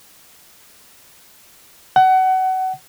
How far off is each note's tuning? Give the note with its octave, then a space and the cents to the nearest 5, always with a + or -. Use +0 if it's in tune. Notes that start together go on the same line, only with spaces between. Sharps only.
F#5 +25